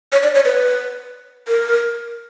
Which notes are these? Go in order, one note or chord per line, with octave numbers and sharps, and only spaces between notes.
C#5
D5
C#5
B4
A#4